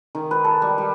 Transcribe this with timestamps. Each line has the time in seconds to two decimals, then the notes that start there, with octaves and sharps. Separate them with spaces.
0.15 D#3
0.31 B4
0.44 A4
0.62 G3
0.78 G3